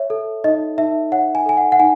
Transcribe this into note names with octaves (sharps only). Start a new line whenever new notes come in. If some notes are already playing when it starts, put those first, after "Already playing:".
Already playing: C#5 E5
A4
D#4 D#5
D#4 E5
C#5 F#5
G#5
A4 G#5
F#5
F#5
D#4 G#5